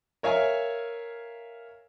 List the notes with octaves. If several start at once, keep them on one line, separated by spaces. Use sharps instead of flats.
A#4 C#5 E5 F5 G#5